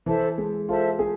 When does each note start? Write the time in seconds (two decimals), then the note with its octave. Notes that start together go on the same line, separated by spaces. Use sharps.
0.06 E3 A4 C5 E5 A5
0.38 G#3
0.68 F4 A4 C5 E5 A5
0.99 G#4